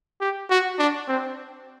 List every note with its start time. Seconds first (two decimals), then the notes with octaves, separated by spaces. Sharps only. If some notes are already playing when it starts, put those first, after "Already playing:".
0.21 G4
0.50 F#4
0.79 D4
1.08 C4